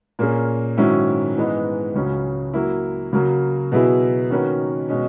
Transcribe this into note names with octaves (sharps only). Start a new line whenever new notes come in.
A#2 A#3 C#4 G#4
G#2 D#3 F#3 C#4 E4
G#2 E3 G#3 B3 D#4
C#2 C#3 F#3 C#4
F#3 A#3 E4
C#3 F#3 A#3
B2 F#3 B3 E4 G#4
D#3 A#3 C#4 F#4 B4
B2 G#3 C#4